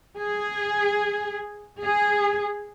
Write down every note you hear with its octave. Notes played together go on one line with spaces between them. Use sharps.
G#4
G#4